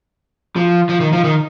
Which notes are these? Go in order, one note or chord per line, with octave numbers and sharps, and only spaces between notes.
F3
F3
D#3
F3
D#3